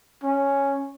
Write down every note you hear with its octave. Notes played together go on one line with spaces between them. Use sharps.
C#4